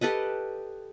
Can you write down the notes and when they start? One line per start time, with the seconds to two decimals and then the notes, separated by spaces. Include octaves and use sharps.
0.01 G4 A4 B4 D#5